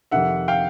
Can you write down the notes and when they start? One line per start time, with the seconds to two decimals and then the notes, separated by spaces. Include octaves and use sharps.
0.11 F2 C3 D#3 E5 F#5
0.48 F5 G5